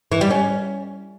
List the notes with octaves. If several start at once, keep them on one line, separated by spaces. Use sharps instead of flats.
E3
G3
C#4